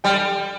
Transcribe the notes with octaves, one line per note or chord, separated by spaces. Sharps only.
G3 G5